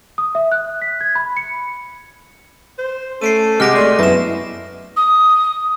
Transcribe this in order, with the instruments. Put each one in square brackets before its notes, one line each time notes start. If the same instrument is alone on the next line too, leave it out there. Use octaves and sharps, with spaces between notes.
[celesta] D#6
E5
F#6
B6
G#6
B5
C#7
[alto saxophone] C5
[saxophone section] A3 C#4 A4 [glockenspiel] C7 D7 D#7
[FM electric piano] C3 F#5 [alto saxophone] G#3 [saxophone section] G4 [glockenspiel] F6 A#6 D7
[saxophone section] A3 [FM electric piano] D5 D#5 C6
[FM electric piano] F#2 B3 E4 [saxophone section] B2 C#4 [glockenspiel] A#6 E7
[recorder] D#6